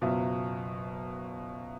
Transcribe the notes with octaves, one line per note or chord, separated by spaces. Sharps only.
F#1 B2 F#3 F4 E5